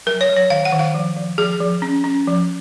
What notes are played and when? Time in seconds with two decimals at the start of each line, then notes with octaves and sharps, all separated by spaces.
0.06 F#3 A#4
0.21 C#5
0.29 F#3
0.36 C#5
0.50 D#3 F5
0.65 F#5
0.72 D#3
0.79 F5
0.94 F3
1.16 F3
1.38 F3 G#4
1.60 F3
1.82 C#4
2.04 C#4
2.27 F3